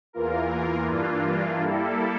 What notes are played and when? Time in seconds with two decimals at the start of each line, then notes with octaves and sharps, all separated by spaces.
0.13 E2 E3 A#3 F4 A#4
0.87 G2 E3 A#3 D4 F4
1.61 G3 A#3 E4 A4